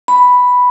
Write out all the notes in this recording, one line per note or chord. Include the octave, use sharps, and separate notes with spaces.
B5